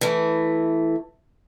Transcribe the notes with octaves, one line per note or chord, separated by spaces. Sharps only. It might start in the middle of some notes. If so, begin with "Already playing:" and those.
E3 A3